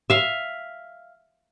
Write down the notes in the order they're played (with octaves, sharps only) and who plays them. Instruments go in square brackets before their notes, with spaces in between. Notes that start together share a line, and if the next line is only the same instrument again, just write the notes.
[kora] E5 F5